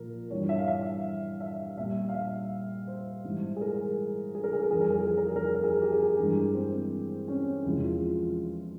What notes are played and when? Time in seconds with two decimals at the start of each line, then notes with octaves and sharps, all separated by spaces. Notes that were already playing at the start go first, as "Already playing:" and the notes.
Already playing: A#2 F3 A#4
0.30 G2 E3 G3 C#5
0.49 E5
0.58 F5
0.68 E5
1.41 E5
1.78 A#2 G3 E5
2.09 F5
2.14 E5
2.87 C5
3.24 G#2 E3 G3
3.56 G#4
3.61 A#4
4.35 G#4
4.44 A#4
4.53 G#4
4.62 A#4
4.71 F2 E3 G3 G#4
4.80 A#4
4.90 G#4
4.99 A#4
5.08 G#4
5.17 A#4
5.27 G#4
5.36 A#4
5.45 G#4
5.55 A#4
5.64 G#4
5.81 G4
5.92 G#4
6.02 G4
6.18 G2 E3 G#3
6.55 C4
7.28 C#4
7.65 E2 C3 F3 G#3 E4
7.83 F4